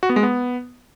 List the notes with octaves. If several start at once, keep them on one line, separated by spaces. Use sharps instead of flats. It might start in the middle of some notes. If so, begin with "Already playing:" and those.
F#4
B3
G#3
B3